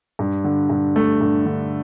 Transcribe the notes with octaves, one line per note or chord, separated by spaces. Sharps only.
G2
D3
G2
A3
G2
D3